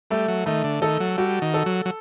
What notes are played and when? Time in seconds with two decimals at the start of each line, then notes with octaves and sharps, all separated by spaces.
0.10 G3 A3
0.28 F#3
0.46 D#3 A3
0.64 D3
0.82 D#3 A4
1.00 F#3
1.18 G3 F#4
1.42 D#3
1.54 A4
1.66 F#3
1.85 F#3